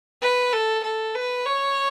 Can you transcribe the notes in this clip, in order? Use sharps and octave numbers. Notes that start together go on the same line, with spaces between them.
B4
A4
A4
B4
C#5